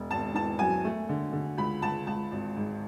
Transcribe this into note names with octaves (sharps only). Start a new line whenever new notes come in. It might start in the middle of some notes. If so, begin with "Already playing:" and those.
Already playing: E1
G#1 A5
E3 A5
F#2 G#5
A3
D3
D3
C#2 B5
C#2 A5
C#2 A5
G#1
G#2